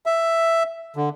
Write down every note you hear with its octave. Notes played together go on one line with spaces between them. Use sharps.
E5
D3